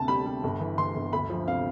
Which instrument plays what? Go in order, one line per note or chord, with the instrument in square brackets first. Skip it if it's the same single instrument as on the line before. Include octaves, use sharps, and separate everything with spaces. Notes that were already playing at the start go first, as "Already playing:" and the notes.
Already playing: [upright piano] D2 C3 A5
G3 B5
G3
G1
E3
E3 C6
G1
D2 B5
F3
C3 F5